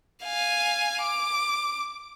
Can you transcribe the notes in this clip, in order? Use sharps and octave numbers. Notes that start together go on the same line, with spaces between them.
F5 G#5
D6